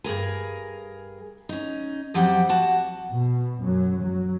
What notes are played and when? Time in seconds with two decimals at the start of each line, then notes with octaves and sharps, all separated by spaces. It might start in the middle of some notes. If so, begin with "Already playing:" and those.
0.04 G2 G#4 A#4 G#5
1.49 C#4 D#4
2.14 F2 F3 F#3 G4 C5 F#5
2.49 F#4 F#5 A5
3.12 B2
3.62 F#2 F#3
4.01 F#3